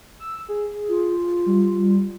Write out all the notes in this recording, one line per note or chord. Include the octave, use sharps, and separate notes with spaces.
E6
G#4
F4
G3